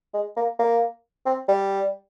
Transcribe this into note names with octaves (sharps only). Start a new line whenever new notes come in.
G#3
A#3
A#3
C4
G3